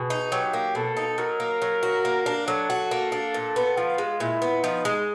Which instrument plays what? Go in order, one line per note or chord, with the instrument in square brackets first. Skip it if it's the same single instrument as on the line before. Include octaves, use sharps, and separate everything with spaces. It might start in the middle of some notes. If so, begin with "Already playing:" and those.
Already playing: [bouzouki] B2 [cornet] G#4
[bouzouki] D#4
[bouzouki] F#3 [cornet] G4
[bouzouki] A#3
[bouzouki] B2 [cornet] A4
[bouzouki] D#4
[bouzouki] F#3 [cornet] A#4
[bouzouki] A#3
F#3
F#4
A#3
D4
[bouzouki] F#3 [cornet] A4
[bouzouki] F#4
A#3
D4
A#2
B3
[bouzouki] F3 [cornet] F4
[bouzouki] G#3
[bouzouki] A#2 [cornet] E4
[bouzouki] B3
[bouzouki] F3 [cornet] D#4
[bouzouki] G#3